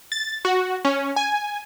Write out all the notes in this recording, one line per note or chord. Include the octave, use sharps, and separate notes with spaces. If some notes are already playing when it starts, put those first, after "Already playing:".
A6
F#4
C#4
G#5